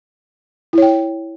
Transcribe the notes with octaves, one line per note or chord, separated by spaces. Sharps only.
E4 C#5 G5